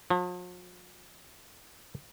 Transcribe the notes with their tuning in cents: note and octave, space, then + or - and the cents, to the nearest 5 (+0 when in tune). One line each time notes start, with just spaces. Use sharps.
F3 +45